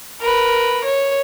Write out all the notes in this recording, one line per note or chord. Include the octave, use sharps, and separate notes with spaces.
A#4 B4
C#5